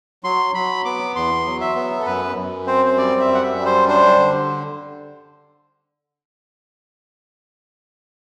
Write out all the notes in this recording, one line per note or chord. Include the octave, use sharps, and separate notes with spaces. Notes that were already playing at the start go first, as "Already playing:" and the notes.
F#3 C6
F#3 B5
B3 D6
E2 C6
F#3
E5
B3
A4
F#2 B4
F#2
C4 C5
C5
G3 D5
E5
F#2
F#5
E5
G3
C5
D4 C5
D3